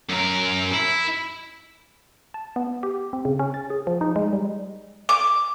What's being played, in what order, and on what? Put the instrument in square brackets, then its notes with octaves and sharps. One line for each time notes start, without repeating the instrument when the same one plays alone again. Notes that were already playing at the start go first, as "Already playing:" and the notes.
[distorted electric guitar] F#2 A#4
E4
[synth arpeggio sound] A5
B3
G4
C4
C#3
C#4
A6
G#4
F3
D#4
G#3
G3
[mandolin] D6